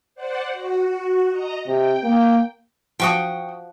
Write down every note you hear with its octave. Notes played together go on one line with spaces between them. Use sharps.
C5 D5 F#5
F#4
D#5 A#5
C3 G5
A#3
F3 F#4 G5 C#6 D#6